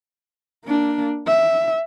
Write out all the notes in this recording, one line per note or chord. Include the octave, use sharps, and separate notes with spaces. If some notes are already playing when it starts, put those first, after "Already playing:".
A#3 D4
E5